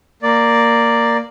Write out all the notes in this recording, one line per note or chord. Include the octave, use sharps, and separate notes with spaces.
A#3 D5